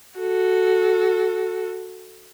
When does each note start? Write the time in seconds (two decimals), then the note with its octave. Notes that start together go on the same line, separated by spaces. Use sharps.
0.19 F#4 A4